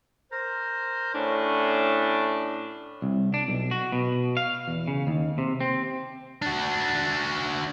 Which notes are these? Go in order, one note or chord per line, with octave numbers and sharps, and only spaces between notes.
A#4 C5
A2 C#4 D4
C2
D4
B1
F#4
B2
F5
E2
C#3
D#2
C3
C4
D4 F#4